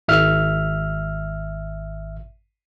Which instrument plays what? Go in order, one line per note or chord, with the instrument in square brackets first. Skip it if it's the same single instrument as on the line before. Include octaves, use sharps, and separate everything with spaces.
[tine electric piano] G#1 E5 F6